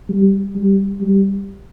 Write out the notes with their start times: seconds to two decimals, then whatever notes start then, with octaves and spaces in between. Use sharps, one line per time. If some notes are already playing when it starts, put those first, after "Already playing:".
0.09 G3
0.55 G3
1.01 G3